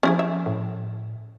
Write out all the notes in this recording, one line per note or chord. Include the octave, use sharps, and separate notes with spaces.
F3 C#4 E4 G#4
E5
A2